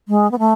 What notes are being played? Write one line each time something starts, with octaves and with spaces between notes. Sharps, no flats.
G#3
B3
A3